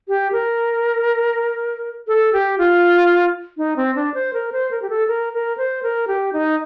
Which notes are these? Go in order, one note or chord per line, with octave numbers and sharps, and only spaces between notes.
G4
A#4
A4
G4
F4
D#4
C4
D4
C5
A#4
C5
A#4
G4
A4
A#4
A#4
C5
A#4
G4
D#4